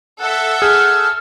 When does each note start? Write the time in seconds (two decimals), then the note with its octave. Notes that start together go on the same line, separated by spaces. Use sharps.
0.21 A4 E5 F#5
0.62 G#4 F6